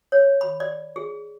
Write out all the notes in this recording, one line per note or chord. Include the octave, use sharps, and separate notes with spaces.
C#5
B5
D5
G#4